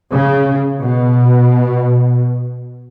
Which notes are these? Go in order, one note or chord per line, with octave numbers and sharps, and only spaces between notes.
C#3
B2